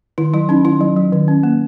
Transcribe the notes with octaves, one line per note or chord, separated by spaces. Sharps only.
D#3 E4
F#3 E4
C#4 D#4
D#3 E4
F#3
F#3
D#3
C#4
A#3